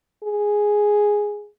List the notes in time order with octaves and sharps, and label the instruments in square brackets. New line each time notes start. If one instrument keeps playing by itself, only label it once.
[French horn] G#4